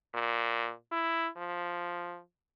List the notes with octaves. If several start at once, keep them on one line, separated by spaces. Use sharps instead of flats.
A#2
E4
F3